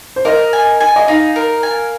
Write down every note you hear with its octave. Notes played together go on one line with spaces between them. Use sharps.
C5
A#4 D#5
G#5
G#5
D#5
D#4 F5
A#4
G#5